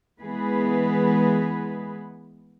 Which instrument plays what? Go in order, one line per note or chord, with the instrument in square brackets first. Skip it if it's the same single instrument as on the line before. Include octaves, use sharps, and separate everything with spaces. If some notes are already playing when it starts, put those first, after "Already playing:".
[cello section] E3 G#3 B3 G#4 B4